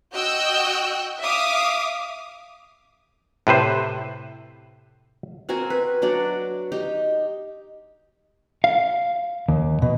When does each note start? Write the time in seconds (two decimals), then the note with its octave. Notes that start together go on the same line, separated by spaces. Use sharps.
0.15 F#4 D#5 G5 E6 F#6 G6
1.22 E5 F5 D6 D#6
3.47 A2 C3 B4 C5
5.49 C4 F#4 A#4 G#5
5.70 B4
6.02 F#3 D4 F#4 D5
6.72 D#4 G4
8.64 F5
9.49 D#2
9.82 B2